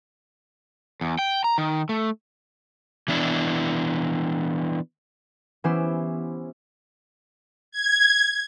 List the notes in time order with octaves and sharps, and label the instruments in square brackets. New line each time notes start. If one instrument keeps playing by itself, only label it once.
[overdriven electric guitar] E2
G5
A#5
D#3
A3
[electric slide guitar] E3 B3 D4 E4
[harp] E3 B3 C#4 E4 G4 C5
[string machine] G#6